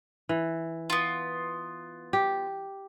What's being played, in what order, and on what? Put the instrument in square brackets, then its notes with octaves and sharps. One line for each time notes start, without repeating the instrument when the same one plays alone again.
[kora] E3
[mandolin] B3 F4
[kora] G4